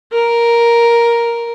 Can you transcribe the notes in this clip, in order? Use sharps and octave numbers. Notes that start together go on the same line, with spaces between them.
A#4